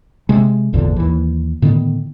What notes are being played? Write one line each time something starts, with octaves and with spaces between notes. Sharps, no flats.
C3 G#3
G#1 E2 A#2 D3
D#2 E3
A2 D3 D#3 B3